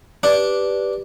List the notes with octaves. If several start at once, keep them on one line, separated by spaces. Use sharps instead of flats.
D4 G4 B4